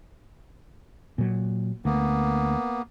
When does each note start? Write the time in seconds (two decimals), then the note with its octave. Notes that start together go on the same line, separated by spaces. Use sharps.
1.18 A#2 F#3
1.85 D2 A#3 B3